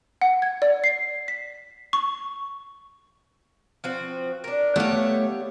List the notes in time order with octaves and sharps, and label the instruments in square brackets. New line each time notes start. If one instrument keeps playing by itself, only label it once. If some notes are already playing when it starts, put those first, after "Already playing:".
[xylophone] F#5
G#6
D5
C7
B6
C#6
[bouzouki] F3 C4 F#4
D4 A#4
[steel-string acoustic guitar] A3 C#5 [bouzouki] B3 G4 F5